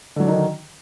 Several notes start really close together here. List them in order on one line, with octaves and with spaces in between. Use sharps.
D3 F#3 D4 D#4 D#3